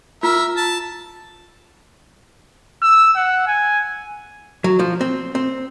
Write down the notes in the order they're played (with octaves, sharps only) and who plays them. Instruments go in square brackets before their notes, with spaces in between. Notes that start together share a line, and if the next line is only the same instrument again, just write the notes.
[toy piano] F4 [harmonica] A#4 E5
[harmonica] A5
[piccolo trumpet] E6
F#5
G#5
[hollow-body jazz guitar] F#3
F3
C4
C4